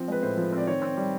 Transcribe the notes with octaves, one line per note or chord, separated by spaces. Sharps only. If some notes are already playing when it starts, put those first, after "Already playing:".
Already playing: F3 C4
G#3 B4
A2 C5
F3
C4
D5
D#3 C#5
C4
G3